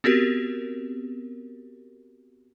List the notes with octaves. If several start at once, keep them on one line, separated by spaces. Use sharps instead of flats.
B3 C4 F#4 G4 A#4